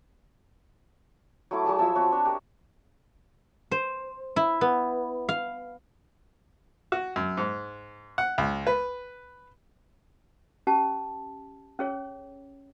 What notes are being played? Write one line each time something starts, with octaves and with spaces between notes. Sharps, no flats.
F#3 A3 E4 D6
F#3 G#4 A5 D6
F3 E5 A5 E6
C4 F#4 C#5
D4 C#5
G4 A#4
C5
E4
B3
F5
F#4
F#2
G#2
F#5
C#2
B4
C#4 G4 A5
C#4 G#4 C#5